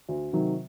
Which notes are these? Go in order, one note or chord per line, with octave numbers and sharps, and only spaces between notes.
D2
C3 D#3 F#3